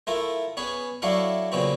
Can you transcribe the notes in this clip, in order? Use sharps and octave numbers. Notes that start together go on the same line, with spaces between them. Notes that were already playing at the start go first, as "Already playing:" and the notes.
A3 E4 F4 A#4
B3 C#4 G#4 B4
F#3 A3 D4 E4 F5 F#5
A#2 C#3 B3 C4 F#4